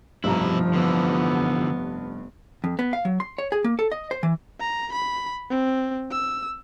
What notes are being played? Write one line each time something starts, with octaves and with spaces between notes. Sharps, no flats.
F1 G2 B2 F3 E4 A#5
D3 E3 B3
F2
B3
F5
F#3
C6
C#5
G#4
A#3
A4
D#5
C5
E3
A#5
B5
C4
E6